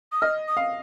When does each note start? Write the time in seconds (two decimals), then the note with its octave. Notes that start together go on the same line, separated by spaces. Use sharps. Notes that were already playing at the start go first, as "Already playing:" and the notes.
0.12 D#6
0.22 D#5 F6
0.48 D#6
0.57 F5